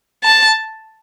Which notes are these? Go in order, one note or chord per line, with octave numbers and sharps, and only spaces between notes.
A5